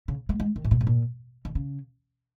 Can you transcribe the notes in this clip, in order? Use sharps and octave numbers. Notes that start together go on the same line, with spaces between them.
C#3
G#3
G#3
D#3
G#2
A#2
G#2
A#2
D#3
C#3